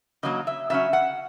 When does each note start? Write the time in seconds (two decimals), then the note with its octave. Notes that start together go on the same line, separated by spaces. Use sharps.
0.23 C#3 F#3 A#3 D#5
0.47 E5
0.70 C#3 F#3 C#4 E5
0.93 F#5